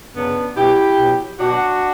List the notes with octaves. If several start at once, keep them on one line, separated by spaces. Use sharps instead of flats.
F#2 C#3 F#3 B3 D4
B2 F#3 E4 G4
B2 F#3
B2 F#3 D4 F#4